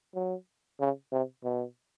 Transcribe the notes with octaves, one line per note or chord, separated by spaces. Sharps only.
F#3
C#3
C3
B2